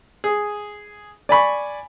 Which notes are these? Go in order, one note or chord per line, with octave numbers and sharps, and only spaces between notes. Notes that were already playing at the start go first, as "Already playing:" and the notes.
G#4
D5 G#5 B5 C#6